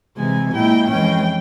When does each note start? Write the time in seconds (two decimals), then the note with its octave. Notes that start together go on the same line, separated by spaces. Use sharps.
0.17 C3 E3 G#3 G#5
0.53 A#2 G#3 E4 G5
0.89 F2 E3 G#3 C#4 G5